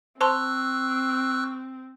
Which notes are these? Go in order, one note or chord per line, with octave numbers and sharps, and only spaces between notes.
C4 C5 A5 C6 C#6 E6 F#6